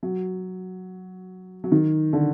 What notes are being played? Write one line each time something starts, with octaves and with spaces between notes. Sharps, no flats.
F#3
F#3
D#3
D3